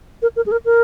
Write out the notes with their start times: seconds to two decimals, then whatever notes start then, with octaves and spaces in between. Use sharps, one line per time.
0.22 A#4
0.36 A#4
0.46 G#4
0.52 A#4
0.65 A#4